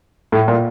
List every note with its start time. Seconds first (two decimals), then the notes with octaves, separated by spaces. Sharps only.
0.32 A2
0.48 A#2